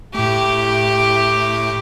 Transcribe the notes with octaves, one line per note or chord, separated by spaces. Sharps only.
A2 A3 G4